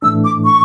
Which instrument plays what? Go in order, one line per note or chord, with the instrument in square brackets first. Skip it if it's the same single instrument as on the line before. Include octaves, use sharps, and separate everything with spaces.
[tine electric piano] A2 E3 A3 D4 [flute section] E6
[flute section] D6
C#6